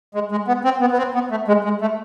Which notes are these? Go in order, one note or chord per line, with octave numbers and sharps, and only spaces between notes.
G#3
G#3
B3
C4
B3
B3
C4
B3
A3
G#3
G#3
A3